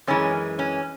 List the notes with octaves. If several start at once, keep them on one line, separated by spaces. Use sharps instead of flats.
F#2 E3 G#3 C#4
C#4